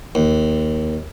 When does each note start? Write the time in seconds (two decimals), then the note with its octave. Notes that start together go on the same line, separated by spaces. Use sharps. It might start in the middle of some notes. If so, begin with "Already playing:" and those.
0.15 D#2